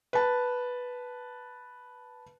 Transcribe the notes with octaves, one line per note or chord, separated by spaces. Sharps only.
B4 A5